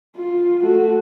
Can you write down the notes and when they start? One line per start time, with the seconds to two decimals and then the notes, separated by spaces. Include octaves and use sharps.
0.17 F4
0.63 A3 F#4